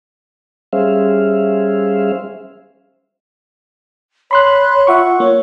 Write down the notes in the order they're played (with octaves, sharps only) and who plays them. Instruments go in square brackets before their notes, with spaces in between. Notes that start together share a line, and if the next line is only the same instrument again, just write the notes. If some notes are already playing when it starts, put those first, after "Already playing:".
[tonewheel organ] G3 C#4 G#4 C5 E5 F5
[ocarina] C#5 [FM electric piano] B5 C6 F#6
[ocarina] F4 [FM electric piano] E5 F#5 C#6
[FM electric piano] A#3 [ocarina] C#5